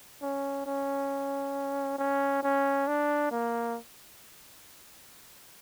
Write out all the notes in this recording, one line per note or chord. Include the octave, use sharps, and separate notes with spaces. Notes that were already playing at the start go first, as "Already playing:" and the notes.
C#4
C#4
C#4
C#4
D4
A#3